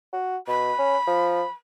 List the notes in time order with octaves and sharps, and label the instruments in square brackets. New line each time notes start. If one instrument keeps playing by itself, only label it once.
[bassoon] F#4
[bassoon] B2 [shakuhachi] B5
[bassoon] C#4
F3